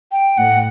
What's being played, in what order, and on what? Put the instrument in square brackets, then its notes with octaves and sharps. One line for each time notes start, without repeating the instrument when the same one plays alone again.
[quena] G5
[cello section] A2 [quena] F#5